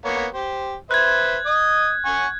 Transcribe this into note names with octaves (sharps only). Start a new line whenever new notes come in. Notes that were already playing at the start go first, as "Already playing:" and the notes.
A#3 B3 C#5
G4 C5
B4 C5 E5 F#6 G#6
D#5 D#6
F#5 G#5 C#6